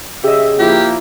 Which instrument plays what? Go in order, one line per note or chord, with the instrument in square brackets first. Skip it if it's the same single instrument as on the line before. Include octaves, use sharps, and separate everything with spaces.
[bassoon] C#3 [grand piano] G4 D#5 [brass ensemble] E5
[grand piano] F3 E4 [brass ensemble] A#3 [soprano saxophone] G4